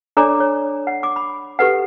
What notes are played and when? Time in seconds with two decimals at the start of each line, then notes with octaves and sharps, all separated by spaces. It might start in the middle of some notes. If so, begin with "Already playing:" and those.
0.17 D4 A4 C#5 D5 A#5 D6
0.40 C#5
0.87 F#5
1.03 D6
1.16 B5
1.59 G4 A4 B4 F#5